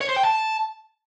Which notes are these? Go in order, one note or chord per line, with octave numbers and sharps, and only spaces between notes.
C#5
C5
G5
A5